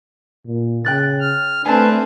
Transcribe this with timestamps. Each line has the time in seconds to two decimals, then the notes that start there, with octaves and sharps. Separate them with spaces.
0.47 A#2
0.84 C#3 G5 F#6 A6
1.20 F6
1.65 A3 C4 D4 B4 G#5 A5